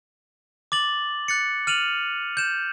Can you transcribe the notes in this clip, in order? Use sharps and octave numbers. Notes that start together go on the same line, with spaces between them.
D6 A6 F#7
F#6 A6 C#7
F6 D#7 F7 F#7
G6 E7